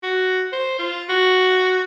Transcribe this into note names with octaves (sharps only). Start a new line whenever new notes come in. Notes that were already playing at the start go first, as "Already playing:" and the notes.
F#4
C5
F4
F#4